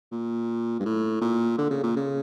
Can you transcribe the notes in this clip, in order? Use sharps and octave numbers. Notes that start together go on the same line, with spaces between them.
A#2
G2
A2
A#2
D3
C#3
A#2
C#3